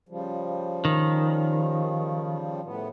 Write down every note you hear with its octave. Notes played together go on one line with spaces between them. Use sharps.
C#3 F3 G3
D#3
A2 B3